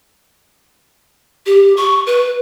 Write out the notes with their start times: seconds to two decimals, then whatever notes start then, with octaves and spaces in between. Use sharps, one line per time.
1.46 G4
1.77 C#6
2.07 B4